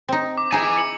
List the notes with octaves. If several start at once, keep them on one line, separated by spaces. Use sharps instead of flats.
C4 D#4
D6
D#4 E4 G#4 G#5
C#7 F#7